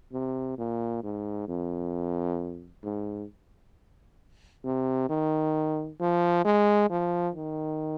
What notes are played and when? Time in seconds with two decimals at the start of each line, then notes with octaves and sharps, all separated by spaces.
0.13 C3
0.58 A#2
1.03 G#2
1.48 F2
2.83 G#2
4.64 C3
5.09 D#3
6.00 F3
6.45 G#3
6.90 F3
7.35 D#3